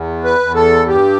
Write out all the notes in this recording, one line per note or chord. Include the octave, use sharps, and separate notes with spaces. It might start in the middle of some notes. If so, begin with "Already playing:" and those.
Already playing: E2
B4
E2
A4
G2 G4